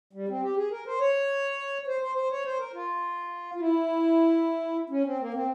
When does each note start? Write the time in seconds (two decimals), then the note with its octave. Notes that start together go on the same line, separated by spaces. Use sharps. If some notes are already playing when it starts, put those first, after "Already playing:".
0.13 G3
0.28 C4
0.42 G4
0.56 G#4
0.71 A#4
0.86 C5
1.00 C#5
1.87 C5
2.01 C5
2.16 C5
2.31 C#5
2.45 C5
2.59 A#4
2.73 F4
3.55 F4
3.60 E4
4.90 C#4
5.05 C4
5.19 A#3
5.34 C4